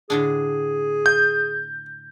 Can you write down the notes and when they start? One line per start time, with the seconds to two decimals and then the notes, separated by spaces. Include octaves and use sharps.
0.10 A2 D3 D4 G#4
1.06 G6